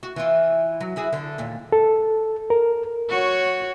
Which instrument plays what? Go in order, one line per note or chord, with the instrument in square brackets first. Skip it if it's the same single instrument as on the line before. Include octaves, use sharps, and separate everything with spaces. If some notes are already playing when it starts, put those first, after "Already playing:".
[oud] F#4
E3 F4
F#3
E4 F#4 G#4
D3
D#2 A#2
[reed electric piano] A4
A#4
[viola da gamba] F#4 C#5